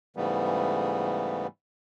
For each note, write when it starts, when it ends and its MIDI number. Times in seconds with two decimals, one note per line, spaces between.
0.16 1.47 44
0.16 1.47 49
0.16 1.47 52
0.16 1.47 55
0.16 1.47 57
0.16 1.47 59